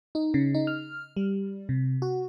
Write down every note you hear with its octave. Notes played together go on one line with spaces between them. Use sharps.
D#4
C#3
D#4
F6
G3
C3
F#4